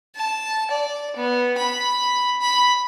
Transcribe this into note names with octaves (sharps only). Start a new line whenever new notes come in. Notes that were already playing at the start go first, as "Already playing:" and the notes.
A5
D5
B3
B5
B5